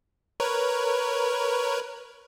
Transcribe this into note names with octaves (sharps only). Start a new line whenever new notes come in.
A#4 B4 C#5